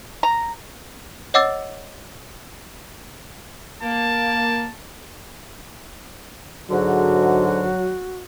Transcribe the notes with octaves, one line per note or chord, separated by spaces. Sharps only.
A#5
C#5 D#5 F#5 D6 E6 A6
A#3 A5
G#2 D3 F#3 F#4